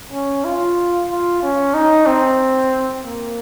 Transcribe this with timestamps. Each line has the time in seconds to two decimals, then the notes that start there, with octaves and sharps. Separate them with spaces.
0.12 C#4
0.45 F4
1.10 F4
1.43 C#4
1.74 D#4
2.06 C4
3.05 A#3